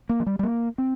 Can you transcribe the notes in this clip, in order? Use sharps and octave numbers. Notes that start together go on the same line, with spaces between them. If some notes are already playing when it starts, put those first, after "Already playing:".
A#3
F3
G3
G3
A#3
C4